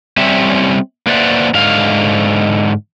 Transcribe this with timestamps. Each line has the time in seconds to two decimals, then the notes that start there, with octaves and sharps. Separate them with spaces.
0.17 G3 C4 C#4 E5
1.07 A#3 B4 C5 D5 E5 F#5
1.54 G#2 D3 F5